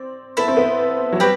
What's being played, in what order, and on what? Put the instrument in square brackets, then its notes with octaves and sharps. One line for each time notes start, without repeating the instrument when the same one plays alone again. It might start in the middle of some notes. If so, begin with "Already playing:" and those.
Already playing: [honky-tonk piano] C4 [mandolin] D5
[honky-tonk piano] B3 [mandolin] E4 A4 E5
[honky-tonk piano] C4
B3
F#3
[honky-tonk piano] G3 [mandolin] C4 G4 B4